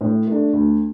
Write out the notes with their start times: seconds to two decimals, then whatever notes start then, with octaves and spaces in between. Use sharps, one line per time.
0.01 A2
0.27 A3 D4
0.53 D2